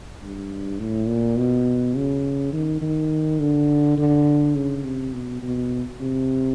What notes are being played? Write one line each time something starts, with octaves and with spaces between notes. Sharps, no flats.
G2
A2
A#2
B2
C#3
D#3
D#3
D3
D3
C#3
C3
B2
B2
C3